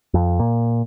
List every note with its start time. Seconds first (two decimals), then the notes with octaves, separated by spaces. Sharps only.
0.14 F2
0.39 A#2